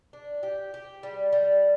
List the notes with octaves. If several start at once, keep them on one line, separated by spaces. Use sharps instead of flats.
D4
G4
G4
G3
G3